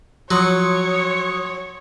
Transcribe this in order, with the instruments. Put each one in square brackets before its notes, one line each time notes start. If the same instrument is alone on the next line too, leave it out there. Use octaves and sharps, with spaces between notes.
[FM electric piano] F3 C6 D#6 [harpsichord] F#3 [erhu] C#5